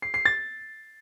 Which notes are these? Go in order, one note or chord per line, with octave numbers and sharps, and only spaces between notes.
C7
C7
A6